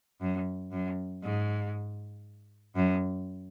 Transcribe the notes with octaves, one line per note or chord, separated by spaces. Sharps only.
F#2
F#2
G#2
F#2